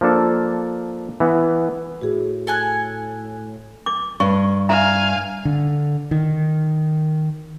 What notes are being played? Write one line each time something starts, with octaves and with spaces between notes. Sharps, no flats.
F3 A#3 D4 A4
E3 B3
A2 F#4 G#4
A4 G#5 F#6
D6
G2 C#6
E5 F5 G#5 A#5
D3
D#3